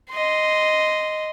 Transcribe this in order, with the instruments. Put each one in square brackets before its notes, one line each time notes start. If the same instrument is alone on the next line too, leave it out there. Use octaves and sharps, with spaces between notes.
[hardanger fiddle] D#5 C6